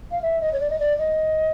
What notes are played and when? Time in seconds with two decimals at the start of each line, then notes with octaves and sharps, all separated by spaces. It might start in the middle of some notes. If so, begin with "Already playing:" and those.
0.11 F5
0.22 E5
0.41 D#5
0.53 C#5
0.60 D5
0.70 D#5
0.79 D5
0.98 D#5